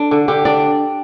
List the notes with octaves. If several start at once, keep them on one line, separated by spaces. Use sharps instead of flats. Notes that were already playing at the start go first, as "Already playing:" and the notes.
Already playing: D4 A4
D3
D3 G4
D4 D5